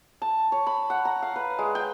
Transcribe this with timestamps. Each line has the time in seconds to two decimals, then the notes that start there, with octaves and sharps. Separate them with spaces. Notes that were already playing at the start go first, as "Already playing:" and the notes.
0.22 A5
0.52 C#5
0.67 B5
0.90 F#5
1.05 A#5
1.22 F5
1.36 B4
1.59 G#3
1.75 G5